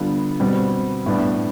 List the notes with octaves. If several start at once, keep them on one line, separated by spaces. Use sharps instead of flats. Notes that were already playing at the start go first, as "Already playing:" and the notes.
Already playing: D3 G3 B3 F4 B4
B2 G3 C4
A2 G3 B3 D4